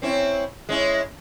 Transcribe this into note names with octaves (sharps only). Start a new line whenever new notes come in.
C4 C#4 E4
G#3 C#4 E4